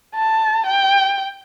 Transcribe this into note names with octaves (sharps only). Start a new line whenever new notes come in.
A5
G5